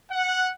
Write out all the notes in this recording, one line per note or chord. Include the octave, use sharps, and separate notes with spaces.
F#5